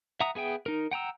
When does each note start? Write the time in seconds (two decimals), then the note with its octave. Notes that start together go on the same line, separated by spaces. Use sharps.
0.20 E5 F#5 A#5 D#6
0.35 B3 G#4 E5 G5
0.66 D#4 A#4
0.91 F#5 G5 A#5 E6